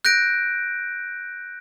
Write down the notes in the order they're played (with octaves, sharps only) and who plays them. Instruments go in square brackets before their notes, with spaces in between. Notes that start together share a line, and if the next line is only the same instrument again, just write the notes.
[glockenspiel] F#6 G6 A#6 D7